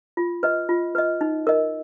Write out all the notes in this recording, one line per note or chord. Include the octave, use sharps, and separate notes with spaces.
F4
B4 D#5
F4
B4 D#5
D#4
A#4 D#5